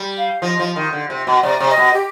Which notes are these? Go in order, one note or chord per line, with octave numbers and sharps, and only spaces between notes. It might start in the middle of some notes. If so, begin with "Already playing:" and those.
Already playing: G3
F5
F3 D#5
F3
D#3
D3
C3
B2
C3 D5
C3
D#5
B2
G4